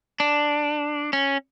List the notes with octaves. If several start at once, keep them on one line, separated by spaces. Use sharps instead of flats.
D4
C#4